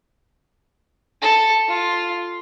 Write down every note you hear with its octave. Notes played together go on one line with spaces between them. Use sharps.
A4
F4